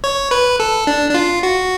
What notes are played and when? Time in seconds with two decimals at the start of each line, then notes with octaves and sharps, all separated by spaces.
0.04 C#5
0.31 B4
0.60 A4
0.87 D4
1.10 D4
1.14 F4
1.43 F#4